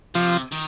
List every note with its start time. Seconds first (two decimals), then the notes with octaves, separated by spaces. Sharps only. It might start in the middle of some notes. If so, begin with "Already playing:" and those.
0.15 C3 F3
0.52 D#3